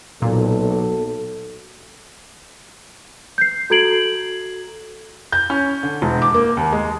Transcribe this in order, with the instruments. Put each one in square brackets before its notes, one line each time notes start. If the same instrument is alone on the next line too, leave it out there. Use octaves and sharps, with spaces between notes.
[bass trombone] B1 [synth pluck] A#2 [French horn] A4
[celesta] G6 C7
F#4 A4 A#5 G#6 D7 F#7
[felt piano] G6
C#4
D3
E1
D6
A#3
D#2
G#3